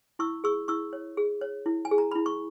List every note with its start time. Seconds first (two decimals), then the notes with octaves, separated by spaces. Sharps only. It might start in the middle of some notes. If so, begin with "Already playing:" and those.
0.19 E4 C#6 E6
0.44 G#4 C#6 E6
0.68 E4 C#6 E6
0.93 C#5
1.17 G#4
1.41 C#5
1.66 E4
1.85 G#5
1.91 G#4
1.98 A#5
2.12 E4 B5
2.26 C#6